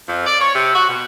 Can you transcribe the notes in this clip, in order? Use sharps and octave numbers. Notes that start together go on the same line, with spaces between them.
F2
D5
C#5
C3
F#4
B2